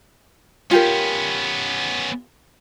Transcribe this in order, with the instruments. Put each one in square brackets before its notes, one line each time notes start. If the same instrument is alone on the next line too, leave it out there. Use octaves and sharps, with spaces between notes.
[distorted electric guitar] B3 C#4 [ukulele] F4 G4 A#4